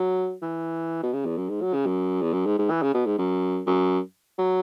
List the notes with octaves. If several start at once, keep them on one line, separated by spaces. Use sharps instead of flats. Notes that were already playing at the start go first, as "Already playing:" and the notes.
Already playing: F#3
E3
B2
C#3
E2
F#2
G#2
F#3
C#3
F#2
E2
F#2
G#2
G#2
E3
C#3
B2
G#2
F#2
F#2
F#3